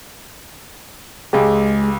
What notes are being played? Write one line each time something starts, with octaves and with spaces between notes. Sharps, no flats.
C#2 G#3 G4